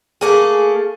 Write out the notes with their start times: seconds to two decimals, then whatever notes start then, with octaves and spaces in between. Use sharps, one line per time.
0.21 A3 A#3 G#4